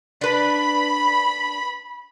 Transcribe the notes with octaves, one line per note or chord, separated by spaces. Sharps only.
D4 B4 B5